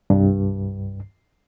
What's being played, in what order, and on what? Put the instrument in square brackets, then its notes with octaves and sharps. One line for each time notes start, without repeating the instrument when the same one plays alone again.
[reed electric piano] C2 G2